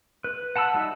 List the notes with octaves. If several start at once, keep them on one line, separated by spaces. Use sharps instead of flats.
B4
F#5 A5 B5 E6
G3 D#4 F#4 E5